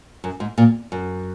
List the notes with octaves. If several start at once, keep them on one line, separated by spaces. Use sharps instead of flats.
F#2
G#2
A#2
F#2